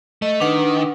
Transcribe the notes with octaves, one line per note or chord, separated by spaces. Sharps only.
A3 D#5
D#3 D4 B4 F#5